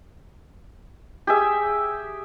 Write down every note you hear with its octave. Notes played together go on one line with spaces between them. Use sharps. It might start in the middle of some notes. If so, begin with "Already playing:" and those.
G4 G#4 E5